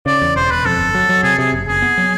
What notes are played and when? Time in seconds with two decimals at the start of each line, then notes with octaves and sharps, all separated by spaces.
0.06 C#3 D5
0.22 E2
0.36 E1 C5
0.51 E1 B4
0.66 F2 A4
0.79 G1
0.95 F#3
1.09 F#3
1.23 C3 G#4
1.39 C3 G#4
1.53 F#1
1.68 F#1 G#4
1.82 B3
1.98 F#3